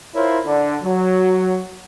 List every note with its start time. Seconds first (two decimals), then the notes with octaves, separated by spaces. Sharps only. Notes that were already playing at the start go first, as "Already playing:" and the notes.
0.15 E4 F4 A#4 C5 C#5
0.45 D3 D4
0.84 F#3